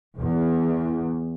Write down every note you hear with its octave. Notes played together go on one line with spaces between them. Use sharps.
E2